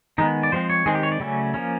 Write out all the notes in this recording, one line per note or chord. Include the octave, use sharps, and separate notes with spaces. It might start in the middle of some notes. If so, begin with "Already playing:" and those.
D#3 G#3 B3 D#4
D5
F3 G#3 C4 C5
C#5
D#3 G#3 C4 G#4
G4
C#5
D5
C#3 F#3 A3 C#4
F3 A#3 C#4